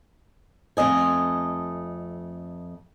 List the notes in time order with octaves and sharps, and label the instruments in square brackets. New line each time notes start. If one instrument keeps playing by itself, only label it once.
[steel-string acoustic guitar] F2 A3 D#5 G#5